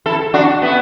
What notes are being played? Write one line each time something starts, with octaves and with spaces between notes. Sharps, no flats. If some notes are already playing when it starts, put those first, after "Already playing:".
E4 A4
D4 F#4
B3 E4